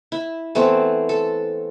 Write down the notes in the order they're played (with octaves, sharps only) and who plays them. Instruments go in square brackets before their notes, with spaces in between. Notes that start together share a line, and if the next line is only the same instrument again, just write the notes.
[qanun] E4
E3 A3 B3 C4
A4